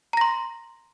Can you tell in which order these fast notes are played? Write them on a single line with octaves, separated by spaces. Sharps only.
A#5 A#6 C6